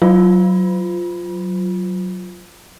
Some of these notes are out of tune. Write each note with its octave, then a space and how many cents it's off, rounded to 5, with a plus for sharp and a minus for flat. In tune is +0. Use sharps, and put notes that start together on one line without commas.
F#3 +0 F4 +0